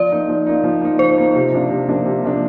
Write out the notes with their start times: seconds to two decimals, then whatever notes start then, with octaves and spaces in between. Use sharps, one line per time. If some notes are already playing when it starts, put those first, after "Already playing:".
Already playing: F3 D5
0.12 A#3 D#4
0.29 F3
0.46 A#3 D#4
0.64 F3
0.81 A#3 D#4
0.99 F3 C5
1.18 A#3 D#4
1.35 C3
1.52 F3 A#3 D4
1.70 C3
1.88 F3 A#3 D4
2.06 C3
2.24 F3 A#3 D4